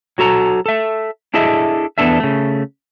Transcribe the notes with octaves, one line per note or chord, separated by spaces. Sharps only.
F#3 F#4 A4 A#5
A4 E5
D4 E4 G#4 A4 D#5 E5
E2 G#3 B3 D4 A4 E5
C#3 A3